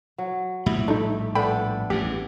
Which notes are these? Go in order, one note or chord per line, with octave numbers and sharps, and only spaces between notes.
F#3
A#1 A2 G3 E4
A3 D4 D#4
B3 D4 A4 G5 B5
A1 E2 G2 G4